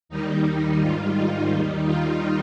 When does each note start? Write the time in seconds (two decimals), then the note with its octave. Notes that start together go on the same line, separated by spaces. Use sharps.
0.09 D#2 D#3 G3 D#4
0.79 G#2 D#3 G3 F4
1.14 D#4
1.49 D#2 D#3 G3 D#4
1.85 F4